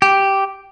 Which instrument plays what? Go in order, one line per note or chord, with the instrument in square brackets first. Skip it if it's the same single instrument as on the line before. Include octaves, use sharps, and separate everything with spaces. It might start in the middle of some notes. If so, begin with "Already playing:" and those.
[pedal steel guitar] G4